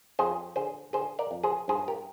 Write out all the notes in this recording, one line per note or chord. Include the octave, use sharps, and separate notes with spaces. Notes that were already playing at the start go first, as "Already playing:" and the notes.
F2 G#4 C5
D3 G#4 C5
D3 G#4 C5
A#4 D5
F2
G#4 C5
G2 G#4 C5
G4 A#4